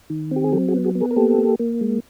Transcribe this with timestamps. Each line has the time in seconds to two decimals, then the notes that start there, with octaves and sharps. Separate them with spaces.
0.10 D#3
0.31 C4 G4
0.44 G#4
0.52 F#3 G4 A4
0.68 F#4 G#4
0.74 B3
0.84 F#4 G#4
0.95 B3
1.00 G#4 A#4
1.11 A#4
1.16 A#3 G4 A4
1.38 A#3
1.59 A#3
1.81 G#3